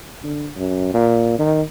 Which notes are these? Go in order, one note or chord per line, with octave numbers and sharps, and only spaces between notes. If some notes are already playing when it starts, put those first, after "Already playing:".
D3
F#2
A#2
D#3